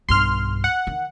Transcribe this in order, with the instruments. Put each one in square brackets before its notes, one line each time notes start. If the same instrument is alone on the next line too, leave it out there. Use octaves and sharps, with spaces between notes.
[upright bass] B1 G2 [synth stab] C6 F6
[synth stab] F#5
[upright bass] D#3